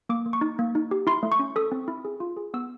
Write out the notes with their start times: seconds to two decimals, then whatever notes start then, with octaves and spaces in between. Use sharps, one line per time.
0.09 A#3 D6
0.26 A#3
0.33 C#6
0.41 D#4
0.59 A#3
0.75 D#4
0.91 G4
1.07 E4 C6
1.23 A3
1.32 C#6
1.39 C#4
1.56 A4 D#6
1.72 C4
1.88 E4
2.05 G#4
2.20 F4
2.37 G#4
2.54 B3 E6